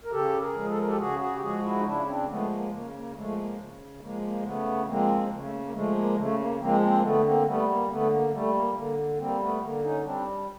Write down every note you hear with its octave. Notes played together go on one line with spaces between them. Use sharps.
A#4
C#3 G4 A4
G#4 A#4
F3 G#3
A4
A#4
G4 A4
C#3 F#4 G#4
F#4 G#4
G4
F3 G#3 F#4 G#4
E4 F#4
D#4
C#3 D4 E4
C4 D4
F3 G#3 A3 B3
A#3
C#3 A#3
A#3
F3 G#3 A3
B3
A#3
C#3
F3 G#3 A#3
A#3
C#3 A3 B3
F3 G#3 A#3 C4
C#3
A3
A#3
A#3
F3 G#3 A3
A#3
C#3 A3
A#3
F3 G#3 A#3 C4
A#3 C4
A#3
D3 A3 B3
A#3 C4
G3 A3 B3
A#3
D3 A3 B3
A#3
G3 A3
A#3
D3 A#3
G3 A#3 C4
A3 B3
D3 A#3
C#4 D#4
G3 C4 D4